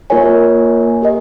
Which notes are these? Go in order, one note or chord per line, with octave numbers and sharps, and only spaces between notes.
A#3 F4 A#4 C#5 G#5
G4 A#4 D#5